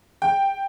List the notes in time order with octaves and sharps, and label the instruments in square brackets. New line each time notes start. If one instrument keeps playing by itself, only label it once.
[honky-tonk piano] G5